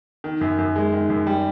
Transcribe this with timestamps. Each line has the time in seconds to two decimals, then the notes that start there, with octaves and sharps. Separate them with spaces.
0.24 D#3
0.41 F#2
0.58 F#2
0.76 G#3
0.93 D#3
1.10 F#2
1.27 G3